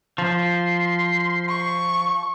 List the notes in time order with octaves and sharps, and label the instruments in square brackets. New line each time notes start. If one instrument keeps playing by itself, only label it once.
[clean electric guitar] F3 [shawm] C6
[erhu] C#6